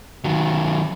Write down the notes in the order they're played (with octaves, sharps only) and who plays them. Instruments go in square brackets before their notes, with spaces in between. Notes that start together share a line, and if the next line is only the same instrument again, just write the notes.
[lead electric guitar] D#3 F#3